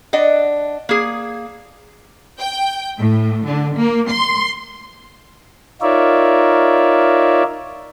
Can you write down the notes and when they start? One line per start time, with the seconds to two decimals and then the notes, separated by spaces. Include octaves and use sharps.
0.13 D4 D#5 F#5
0.89 A#3 G#4
2.40 G5
2.98 A2
3.45 D3
3.77 A#3
4.10 C6
5.81 D#4 F4 A#4 C#5 D5 E5